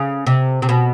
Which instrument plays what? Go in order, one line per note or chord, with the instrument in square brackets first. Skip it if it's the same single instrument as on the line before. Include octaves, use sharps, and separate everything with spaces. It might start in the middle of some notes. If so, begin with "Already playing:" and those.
Already playing: [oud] C#3
C3
C3
B2